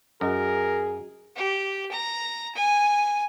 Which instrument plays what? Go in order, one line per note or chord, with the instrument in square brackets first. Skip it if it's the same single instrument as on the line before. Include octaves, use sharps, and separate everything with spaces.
[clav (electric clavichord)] F#2 [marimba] F#4 D#5 [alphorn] G#4 [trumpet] A#4
[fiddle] G4
A#5
G#5